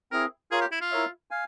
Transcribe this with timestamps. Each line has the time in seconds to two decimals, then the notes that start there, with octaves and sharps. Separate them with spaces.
0.12 C4 E4 G#4 A#4
0.51 F4 G#4 A#4 C#5 F5
0.61 G4
0.71 E4
0.81 F4
0.91 E4 A#4 C#5 E5
1.31 F5 G#5